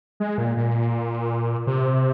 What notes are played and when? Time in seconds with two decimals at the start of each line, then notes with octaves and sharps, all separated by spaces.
0.20 G#3
0.38 A#2
0.57 A#2
1.67 C3